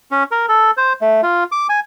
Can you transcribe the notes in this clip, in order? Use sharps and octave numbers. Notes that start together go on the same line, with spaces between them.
C#4
A#4
A4
C5
A3
F4
D6
G#5